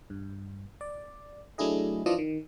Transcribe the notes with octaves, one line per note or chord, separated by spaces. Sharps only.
G2
D5
F#3 A3 D4 E4 G#4 D#5
E3 F3 D4 F4 D5 D#5
D#3